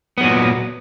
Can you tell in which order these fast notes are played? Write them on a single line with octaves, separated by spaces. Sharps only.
B3 F#3 A#2